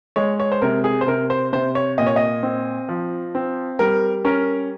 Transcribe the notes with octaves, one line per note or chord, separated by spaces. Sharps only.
G#3 C#5
C#5
C5
C3 A#4
G#4
C5
C3 A#4
C5
C3 C5
C#5
A#2 D#5
C#5
D#5
C4
F3
C4
G3 A#4
C#4 A#4